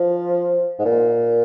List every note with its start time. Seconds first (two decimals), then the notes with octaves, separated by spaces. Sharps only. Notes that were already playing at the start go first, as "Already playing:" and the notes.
Already playing: F3
0.79 G#2
0.85 A#2